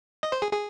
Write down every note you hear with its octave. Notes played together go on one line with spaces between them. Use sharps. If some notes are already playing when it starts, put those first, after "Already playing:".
D#5
C5
G#4
G#4